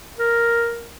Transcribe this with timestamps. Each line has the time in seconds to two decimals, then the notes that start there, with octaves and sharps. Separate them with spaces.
0.19 A#4